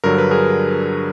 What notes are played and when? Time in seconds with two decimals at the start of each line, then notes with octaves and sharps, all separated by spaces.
0.04 G2 D3 F#3 A#4
0.18 B4
0.31 G#4 A#4